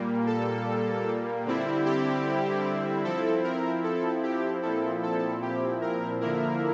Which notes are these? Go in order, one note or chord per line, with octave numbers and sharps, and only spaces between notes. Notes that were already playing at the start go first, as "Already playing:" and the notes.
Already playing: A#2 G3 A#3
A4
D3 G3 C4 E4
G4
F3 C4 E4 A4
A#4
A4
G4
A#2 F3 C4 E4 A4
A4
G4
A#4
D3 F3 A#3 E4 A#4